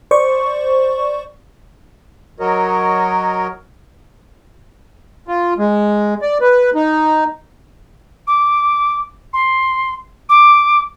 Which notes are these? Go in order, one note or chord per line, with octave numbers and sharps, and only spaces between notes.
C5 D5 C#6
F#3 F#4 A#4 C#5 D#5
F4
G#3
D5
B4
D#4
D6
C6
D6